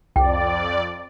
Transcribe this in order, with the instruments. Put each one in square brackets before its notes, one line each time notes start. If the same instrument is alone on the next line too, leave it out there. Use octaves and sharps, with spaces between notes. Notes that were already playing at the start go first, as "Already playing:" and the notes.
[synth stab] C2 [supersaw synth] F2 D5 [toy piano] G5